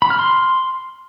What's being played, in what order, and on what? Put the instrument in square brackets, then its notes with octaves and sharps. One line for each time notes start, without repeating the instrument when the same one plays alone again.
[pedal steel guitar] B5
F6
C6